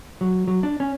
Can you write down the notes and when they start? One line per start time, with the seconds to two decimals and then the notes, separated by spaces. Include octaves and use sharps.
0.21 F#3
0.47 F#3
0.63 D4
0.80 C#4